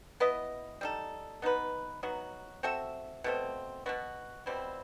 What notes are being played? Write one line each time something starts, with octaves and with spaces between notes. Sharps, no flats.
B3 E4 B4 D#5
G3 D#4 A4
B3 D#4 F#4 B4
F#3 B3 D#4 F#4
C4 F#4 A4 E5
B2 A3 C4
B2 F#3 B3 F#4
B2 G3 C4 E4